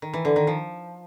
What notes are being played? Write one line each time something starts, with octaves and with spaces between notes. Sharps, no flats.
D#3
E3
D3
D#3
F3